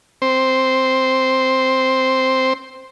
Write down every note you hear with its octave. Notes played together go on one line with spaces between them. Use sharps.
C4 C5